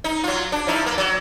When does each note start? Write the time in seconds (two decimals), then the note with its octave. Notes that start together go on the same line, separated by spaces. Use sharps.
0.04 D#4
0.24 F#3 F4
0.52 D4
0.67 F3 D#4 E4
0.86 A#3
0.98 F#3